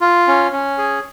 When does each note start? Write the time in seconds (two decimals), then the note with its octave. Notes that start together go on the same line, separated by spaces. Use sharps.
0.01 F4
0.27 C#4
0.53 C#4
0.78 G#4